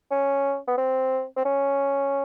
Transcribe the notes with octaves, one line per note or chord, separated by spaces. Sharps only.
C#4
B3
C4
C4
C#4